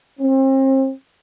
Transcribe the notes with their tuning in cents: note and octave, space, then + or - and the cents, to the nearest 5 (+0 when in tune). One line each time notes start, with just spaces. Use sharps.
C4 +35